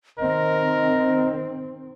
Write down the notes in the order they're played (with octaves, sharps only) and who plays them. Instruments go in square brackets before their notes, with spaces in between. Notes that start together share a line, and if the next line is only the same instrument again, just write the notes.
[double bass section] D#3 C4 [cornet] A#4 [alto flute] D#5